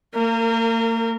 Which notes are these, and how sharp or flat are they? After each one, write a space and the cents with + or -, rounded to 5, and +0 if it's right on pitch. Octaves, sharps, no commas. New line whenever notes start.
A#3 -40 A#4 -20